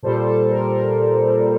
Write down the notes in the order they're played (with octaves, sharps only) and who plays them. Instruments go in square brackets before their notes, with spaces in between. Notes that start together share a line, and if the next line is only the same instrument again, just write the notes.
[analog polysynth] A#2 G3 A4 C5
A4
A#4
A#4